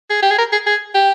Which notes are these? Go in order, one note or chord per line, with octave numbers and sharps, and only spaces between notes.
G#4
G4
G#4
A#4
G#4
G#4
G4